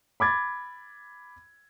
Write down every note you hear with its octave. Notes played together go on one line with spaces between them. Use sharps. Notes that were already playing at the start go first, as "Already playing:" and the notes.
B5 D6 G#6 A6